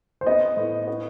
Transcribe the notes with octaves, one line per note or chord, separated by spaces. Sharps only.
C5
B3 D#5
A2
B3